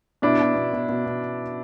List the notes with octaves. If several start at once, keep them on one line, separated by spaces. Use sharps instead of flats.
B2 D4 E4
B2
B2
B2
B2
B2